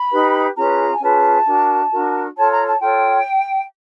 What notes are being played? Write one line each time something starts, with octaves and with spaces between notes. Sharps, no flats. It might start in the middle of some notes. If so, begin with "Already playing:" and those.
Already playing: B5
D#4 G4 B4
C#4 F4 G#4 B4 A#5
G#5
C#4 F4 G#4 B4 A5
D4 F#4 A#4
D4 F#4 A#4
F4 A4 C#5 A5
A#5
A5
F4 A4 C#5 G5